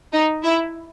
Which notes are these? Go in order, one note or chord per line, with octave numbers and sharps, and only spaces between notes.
D#4
E4